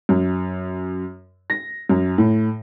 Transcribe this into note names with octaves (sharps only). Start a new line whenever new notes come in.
F#2
A#6
F#2
A2